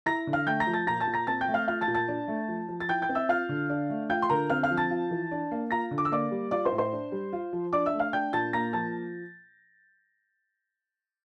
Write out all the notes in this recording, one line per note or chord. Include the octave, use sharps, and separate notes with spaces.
E4 A#5 A#6
D3
F5 F6
A3 G5 G6
A#5 A#6
F3
A5 A6
A#2 A#5 A#6
A5 A6
A#2
A#5 A#6
C4 A5 A6
G5 G6
A3
F5 F6
F4 F5 F6
A5 A6
A#2
A5 A6
D4
A3
F3
F3
A6
E4 G5 G6
G5 G6
C4
E5 E6
F4 F5 F6
D3
D4
A3
F4 G5 G6
C6
D3 A#4 A#5
C4 F5 F6
F5 F6
F3
A5 A6
F4
E3
D4
A#3
F4 A#5 A#6
D3
D6
E6
A#3 D5 D6
G3
F4 D5 D6
C5 C6
A2
C5 C6
D4
G3
F4
F3
D4 D5 D6
E5 E6
A3
F5 F6
D4 G5 G6
A#2 A5 A6
A#3 A#5 A#6
F3 A5 A6